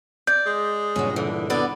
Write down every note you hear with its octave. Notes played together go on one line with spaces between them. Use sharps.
D5 G6
G#3
C#2 G2 A#2 F#3 C#4
D3 E3
D3 F#3 B3 D5